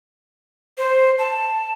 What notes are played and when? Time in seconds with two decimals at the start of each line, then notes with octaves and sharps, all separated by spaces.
0.78 C5
1.18 A5